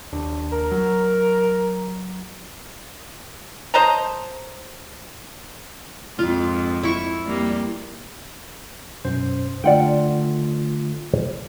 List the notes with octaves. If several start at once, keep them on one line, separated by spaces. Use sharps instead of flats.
D#2 D4
A#4
F#3
C5 D#5 A5 A#5
F2 G#2 F4
E4 C#6
F2 G3 A#3
F#2 B2 C5
D3 A3 F4 D5 F#5 G5